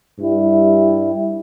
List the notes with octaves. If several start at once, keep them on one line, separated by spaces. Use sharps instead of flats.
G2 G3 E4